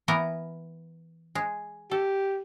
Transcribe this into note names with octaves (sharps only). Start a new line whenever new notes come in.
E3 B3 A#4
G#3
G4 A4